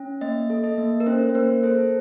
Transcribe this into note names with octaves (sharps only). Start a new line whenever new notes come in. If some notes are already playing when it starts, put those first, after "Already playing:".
Already playing: C#4
A#3 D#5
A4
D#5
A#3
A#4
C#4 C5
C5
A#3 A#4
A4 C5